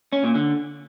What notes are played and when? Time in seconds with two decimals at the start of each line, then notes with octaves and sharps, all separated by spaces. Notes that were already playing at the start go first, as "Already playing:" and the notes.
0.13 C#4
0.24 A#2
0.35 D3